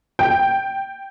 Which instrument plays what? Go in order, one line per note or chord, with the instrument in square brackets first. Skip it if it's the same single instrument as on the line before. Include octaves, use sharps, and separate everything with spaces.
[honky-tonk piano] G5